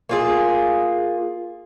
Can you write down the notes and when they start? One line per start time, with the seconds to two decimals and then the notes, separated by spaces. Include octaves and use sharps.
0.09 A#3 F4 G#4